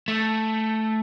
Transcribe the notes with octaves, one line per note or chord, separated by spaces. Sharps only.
A3